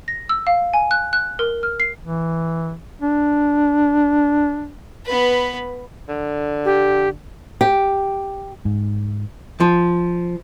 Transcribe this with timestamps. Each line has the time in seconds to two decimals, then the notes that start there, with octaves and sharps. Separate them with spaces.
0.08 A#6
0.29 E6
0.47 F5
0.74 G#5
0.91 F#6
1.13 F#6
1.39 A#4
1.63 F6
1.80 C7
2.03 E3
3.02 D4
5.06 B3 B4
6.09 D3
6.65 G4
7.61 G4
8.65 G#2
9.60 F3